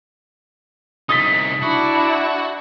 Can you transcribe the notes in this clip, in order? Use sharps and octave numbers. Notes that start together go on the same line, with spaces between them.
C2 D#4 D#6 A6 B6
D4 E4 F#4